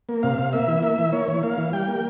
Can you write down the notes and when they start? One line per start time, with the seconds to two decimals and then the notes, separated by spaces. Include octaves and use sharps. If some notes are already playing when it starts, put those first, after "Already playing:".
0.09 A#3
0.23 C3 F5
0.38 C3
0.53 A#3 E5
0.68 E3
0.83 A#3 E5
0.98 E3
1.12 A#3 C#5
1.28 E3
1.43 A#3 F5
1.58 E3
1.73 G3 G5
1.87 A#3